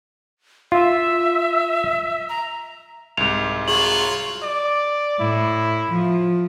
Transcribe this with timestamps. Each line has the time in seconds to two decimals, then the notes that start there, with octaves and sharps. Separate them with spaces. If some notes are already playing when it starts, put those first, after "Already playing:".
0.72 F4 E5
2.29 A#5
3.17 C2 G#2 F7
3.68 F#3 F4 G#4 C#5 F#7
4.43 D5
5.20 A2 E4
5.90 F3